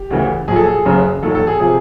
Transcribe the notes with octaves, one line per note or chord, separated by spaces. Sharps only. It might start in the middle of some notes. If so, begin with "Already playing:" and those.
Already playing: G4
D2 C#3 E3
A#1 A#2 F#3 G#4
A4
G#4
F#1 F#2 C#3
E1 D#2 D#3 F#3 A4
A4
G#4
C3 F3 G#4